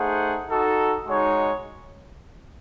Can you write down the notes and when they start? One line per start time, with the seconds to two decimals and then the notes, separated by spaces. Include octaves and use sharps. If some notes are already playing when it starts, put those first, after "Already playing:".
Already playing: A3 D#4 G#4 C5 F#5
0.49 D#4 F#4 A4
1.07 G#3 D#4 F#4 C#5